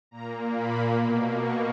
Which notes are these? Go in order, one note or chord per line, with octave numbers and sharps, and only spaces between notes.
A#2 A#3 A#5
B5
B2 A#3
C#6